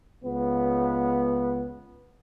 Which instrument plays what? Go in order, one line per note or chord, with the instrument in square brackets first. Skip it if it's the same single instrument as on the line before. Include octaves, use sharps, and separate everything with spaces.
[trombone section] C#2 B3